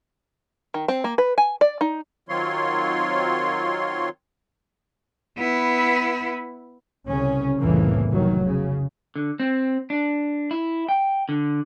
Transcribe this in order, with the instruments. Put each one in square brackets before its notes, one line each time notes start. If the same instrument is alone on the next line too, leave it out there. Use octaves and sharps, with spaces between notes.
[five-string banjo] D#3
C4
A#3
B4
G#5
D5
D#4
[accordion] D#3 F#3 C4 F4 C#5 C6
[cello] B3 E4
[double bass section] C2 C#3 C#4
C2 F2 A2 C#3 E3 A#3
F1 D#3 F#3
C#3
[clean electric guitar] D3
C4
D4
E4
G5
D3